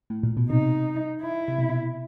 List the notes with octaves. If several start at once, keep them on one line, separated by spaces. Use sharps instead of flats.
A2
A#2
B2
C3 D#4
E4
C3
B2